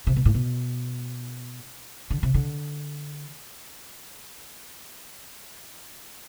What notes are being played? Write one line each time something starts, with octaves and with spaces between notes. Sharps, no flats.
C3
B2
A2
B2
D3
C3
D3